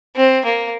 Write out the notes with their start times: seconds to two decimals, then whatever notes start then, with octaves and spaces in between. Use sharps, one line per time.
0.16 C4
0.45 A#3